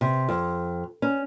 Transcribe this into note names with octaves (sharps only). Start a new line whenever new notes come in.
C3
F2
C#4